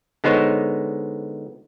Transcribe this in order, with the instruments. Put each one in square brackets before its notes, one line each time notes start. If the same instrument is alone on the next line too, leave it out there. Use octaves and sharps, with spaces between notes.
[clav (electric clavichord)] D3 G#3 B3 D#4 C5 C#5